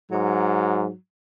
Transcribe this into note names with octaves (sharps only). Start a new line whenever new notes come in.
G#2 F#3